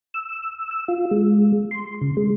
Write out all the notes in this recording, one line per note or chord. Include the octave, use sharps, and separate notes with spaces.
E6
E6
F4
G#3
C6
C#3
G#3